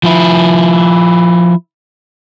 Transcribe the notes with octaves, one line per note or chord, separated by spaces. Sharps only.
F3 E4